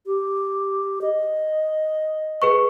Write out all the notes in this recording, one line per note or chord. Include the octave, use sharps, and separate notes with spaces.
G4
D#5
G#4 B4 C#6